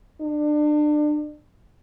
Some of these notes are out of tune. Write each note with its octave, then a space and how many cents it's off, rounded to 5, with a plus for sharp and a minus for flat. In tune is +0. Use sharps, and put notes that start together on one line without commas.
D4 +30